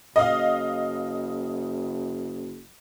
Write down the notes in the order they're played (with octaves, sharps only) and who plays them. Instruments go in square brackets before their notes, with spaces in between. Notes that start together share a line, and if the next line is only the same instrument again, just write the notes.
[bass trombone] F#1 [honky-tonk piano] D#5 F5